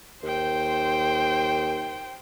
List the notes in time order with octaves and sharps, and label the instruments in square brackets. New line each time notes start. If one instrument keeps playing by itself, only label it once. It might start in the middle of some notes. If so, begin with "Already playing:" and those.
[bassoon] D#2 [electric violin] C5 G5